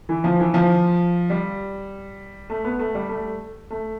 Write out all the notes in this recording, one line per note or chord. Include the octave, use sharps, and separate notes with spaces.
E3
F3
E3
F3
G3
A3
B3
A3
G3
A3
A3